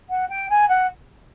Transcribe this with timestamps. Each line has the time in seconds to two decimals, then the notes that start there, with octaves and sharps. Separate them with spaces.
0.09 F#5
0.29 G5
0.49 G#5
0.68 F#5